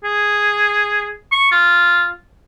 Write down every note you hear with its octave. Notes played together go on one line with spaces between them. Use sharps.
G#4
C#6
F4